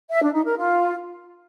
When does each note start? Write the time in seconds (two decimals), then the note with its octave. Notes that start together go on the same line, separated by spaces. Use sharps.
0.11 E5
0.22 D4
0.34 D#4
0.45 A#4
0.57 F4